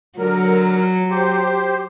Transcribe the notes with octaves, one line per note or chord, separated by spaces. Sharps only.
D3 F#3 A#4
G4 C5